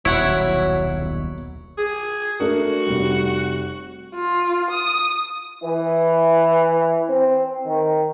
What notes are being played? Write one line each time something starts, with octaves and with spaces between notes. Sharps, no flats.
D#1 B1 F#3 E4 C#5 F#5 B5
G#4
A3 D4 F#4 A#4
F1 G3
F4
D#6
E3
C4
D#3